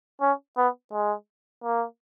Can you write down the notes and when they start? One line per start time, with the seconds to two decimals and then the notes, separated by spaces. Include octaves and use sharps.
0.21 C#4
0.57 B3
0.92 G#3
1.64 A#3